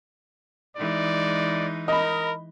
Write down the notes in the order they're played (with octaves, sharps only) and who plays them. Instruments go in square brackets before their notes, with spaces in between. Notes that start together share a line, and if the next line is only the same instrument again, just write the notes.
[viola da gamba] E3 G#3 D#4 [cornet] D5
[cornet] A#4 [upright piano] D#5 B5